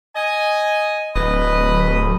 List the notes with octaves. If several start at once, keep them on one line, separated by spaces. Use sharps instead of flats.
D#5 G#5
D1 B4 D#5 B5